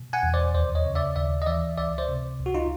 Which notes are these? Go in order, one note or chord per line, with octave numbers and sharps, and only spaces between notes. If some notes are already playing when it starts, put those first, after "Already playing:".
Already playing: B2
F#5 G#5
E2
C5 D5
D#2 C5 D5
C#5 D#5
C#3
D5 E5
D#2 D5 E5
D#5
E3 D5 E5
C#2 D5 E5
C5 D5
C3
C#2
F#4
D#4 F4